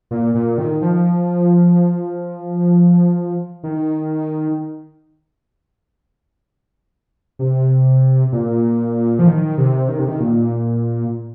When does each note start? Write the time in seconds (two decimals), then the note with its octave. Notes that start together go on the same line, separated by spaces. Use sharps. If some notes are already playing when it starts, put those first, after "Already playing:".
0.11 A#2
0.35 A#2
0.58 D#3
0.82 F3
3.63 D#3
7.39 C3
8.32 A#2
9.19 F3
9.27 D#3
9.58 C3
9.89 D#3
9.99 C3
10.08 D#3
10.20 A#2